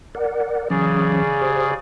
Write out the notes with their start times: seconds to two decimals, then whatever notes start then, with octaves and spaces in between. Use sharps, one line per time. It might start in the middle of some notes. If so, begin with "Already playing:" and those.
0.15 A#4 D5 F#5
0.70 C#3 E3 F#3 C#4 G#4 D5
1.41 G4 C5